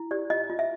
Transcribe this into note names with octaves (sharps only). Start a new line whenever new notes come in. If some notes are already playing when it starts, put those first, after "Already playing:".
Already playing: E4
G4 D5
F4 D#5
F4
E5